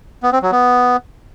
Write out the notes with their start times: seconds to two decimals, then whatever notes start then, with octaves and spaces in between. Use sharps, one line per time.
0.23 B3
0.33 C4
0.42 F#3
0.52 B3